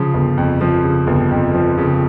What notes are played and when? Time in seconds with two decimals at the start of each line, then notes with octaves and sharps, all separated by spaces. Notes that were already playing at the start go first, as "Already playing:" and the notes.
Already playing: C#3 F3
0.14 G1
0.38 F2
0.61 F3
0.84 C#3
1.07 G1
1.31 F2
1.54 F3
1.78 C#3